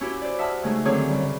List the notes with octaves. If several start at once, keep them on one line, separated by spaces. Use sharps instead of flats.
C#4 E4 F#4 G4 B4
C5 D5
E5 F#5 A5 D#6 F6
C#3 G#3 A3 D#4 G#4
F#2 D3 D#3 C4 G#4 C#5
C#3 G3